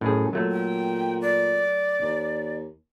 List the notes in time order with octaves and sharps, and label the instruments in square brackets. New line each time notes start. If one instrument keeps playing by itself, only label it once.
[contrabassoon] F#2 [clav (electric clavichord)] A2 G#4
[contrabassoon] A#2 [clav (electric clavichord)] F#3 A3 A4
[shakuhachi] G5
D5
[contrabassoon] D#2